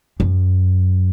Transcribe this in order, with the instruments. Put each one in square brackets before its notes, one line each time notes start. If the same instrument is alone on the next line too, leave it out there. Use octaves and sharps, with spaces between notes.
[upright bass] F#2